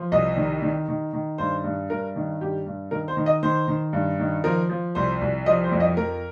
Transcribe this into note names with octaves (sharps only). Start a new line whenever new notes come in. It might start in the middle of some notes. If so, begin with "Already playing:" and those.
Already playing: F3
C2 D#5
D#3
D#3
D#3
D#3
G2 C5
G2
G2 A#4
D#3
G2 G4
G2
D#3 A#4
C5
D#3
D#5
D#3 C5
D#3
G2
D#3
F3 A#4
F3
C2 C5
C2
F3 D#5
C5
F2
D#5
F2 A#4